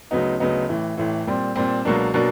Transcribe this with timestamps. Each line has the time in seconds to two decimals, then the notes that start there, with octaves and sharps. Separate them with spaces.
0.11 D2 C#3 F#3 B3 D#4
0.40 D2 C#3 F#3 B3 D#4
0.69 A1 A2 E3
0.98 A1 A2 E3
1.27 A#2 G3 C4
1.56 A#2 G3 C4
1.85 C#2 B2 F#3 A#3 D4
2.14 B2 F#3 A#3 D4